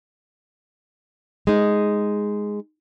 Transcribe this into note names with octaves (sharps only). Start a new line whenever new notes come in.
G#3 D#4